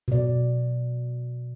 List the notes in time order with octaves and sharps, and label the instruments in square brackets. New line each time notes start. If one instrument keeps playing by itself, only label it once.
[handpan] B2 D5